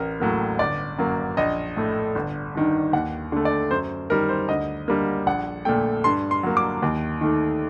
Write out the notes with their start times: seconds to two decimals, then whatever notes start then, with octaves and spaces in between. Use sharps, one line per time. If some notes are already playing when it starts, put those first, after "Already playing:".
Already playing: A1 A#4
0.20 A2 F#3 A#3
0.59 G1 D5
0.98 F#2 F#3 A#3
1.37 A#1 D#5
1.76 A2 A3
2.15 G1
2.55 G2 D#3
2.93 D#2 F#5
3.32 D3 A3
3.45 D5
3.71 F#2 C5
4.10 D#3 G3 A#4
4.29 C5
4.49 D2 D#5
4.88 D3 G3 A#3
5.26 A#1 F#5
5.65 A#2 A3 G5
6.04 G2 C6
6.31 C6
6.43 F#3 A#3
6.57 D6
6.82 D#2
7.21 D#3 A3